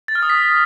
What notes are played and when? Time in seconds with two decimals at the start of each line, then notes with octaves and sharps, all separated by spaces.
0.08 A6
0.15 F6
0.22 D#6
0.30 B6